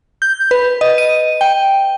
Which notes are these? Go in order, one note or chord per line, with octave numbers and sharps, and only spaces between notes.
G6
B4
D#5
D#7
G5